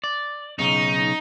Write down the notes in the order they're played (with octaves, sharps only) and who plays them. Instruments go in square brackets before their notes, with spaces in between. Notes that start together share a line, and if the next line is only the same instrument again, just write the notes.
[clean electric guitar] D5
[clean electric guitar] B1 C#3 [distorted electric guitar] D#4